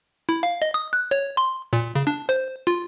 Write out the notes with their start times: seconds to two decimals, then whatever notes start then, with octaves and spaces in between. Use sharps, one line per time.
0.29 E4
0.43 F5
0.62 D#5
0.74 D#6
0.93 F#6
1.11 C#5
1.37 C6
1.73 A#2
1.95 C#3
2.07 D4
2.29 C5
2.67 F4